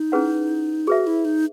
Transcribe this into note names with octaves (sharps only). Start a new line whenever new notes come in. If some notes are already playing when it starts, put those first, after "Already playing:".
Already playing: D#4
C#4 E4 G#4 B4 F#5
F#4 G#4 B4 E5
E4
D#4